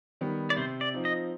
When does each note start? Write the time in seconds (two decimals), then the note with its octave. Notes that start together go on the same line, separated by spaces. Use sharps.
0.21 D#3 G3 B3
0.50 D5
0.57 C3 C5
0.81 D5
0.94 F3 C4 D#4
1.05 D#5